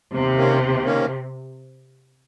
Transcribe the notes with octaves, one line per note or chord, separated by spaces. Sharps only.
D#2 C3
D#3 A#3 C#4
D#2
D#3 A#3 C#4